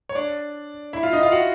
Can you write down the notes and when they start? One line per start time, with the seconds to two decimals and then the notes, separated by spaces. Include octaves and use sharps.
0.09 C#5
0.15 D4 D5
0.93 E4 E5
1.03 F4 F5
1.13 D#4 D#5
1.23 F4 F5
1.32 F#4 F#5